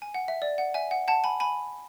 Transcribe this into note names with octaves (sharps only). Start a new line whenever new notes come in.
G#5
F#5
E5
D5
F#5
E5 G#5
F#5
F#5 A5
G#5 B5
G#5 B5